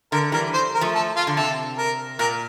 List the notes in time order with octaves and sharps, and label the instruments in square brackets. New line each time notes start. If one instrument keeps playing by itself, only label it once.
[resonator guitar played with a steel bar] D3 [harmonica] A#4
[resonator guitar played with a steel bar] E3 G3 [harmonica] A#4
[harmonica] C5
A#4
[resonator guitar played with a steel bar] F3 A3
[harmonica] A4
F4
[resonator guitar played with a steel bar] D3
[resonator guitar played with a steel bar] C3 [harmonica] A4
[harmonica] A#4
[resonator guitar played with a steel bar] A#2 [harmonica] A#4